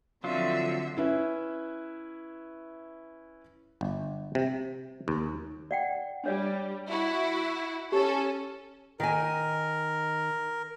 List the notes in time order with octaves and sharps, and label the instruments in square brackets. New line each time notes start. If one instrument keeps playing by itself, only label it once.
[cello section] D3 F3 C4 [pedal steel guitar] F#3 F4 [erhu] E5
[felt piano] C#4 E4 B4 E5
[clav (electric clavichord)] G1
C3
D#2
[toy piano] D5 F#5 G5
[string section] G3 [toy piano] D4 C#5 D5
[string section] E4 F#4
[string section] C#4 A4 [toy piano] G4
[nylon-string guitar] D#3 G#5 [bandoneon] A#4